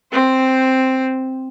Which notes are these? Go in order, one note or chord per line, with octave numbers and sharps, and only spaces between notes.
C4 C5